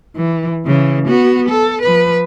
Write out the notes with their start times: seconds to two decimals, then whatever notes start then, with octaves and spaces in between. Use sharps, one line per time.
0.16 E3
0.66 C#3 E3
1.08 B3 F#4
1.49 A4
1.82 F3 B4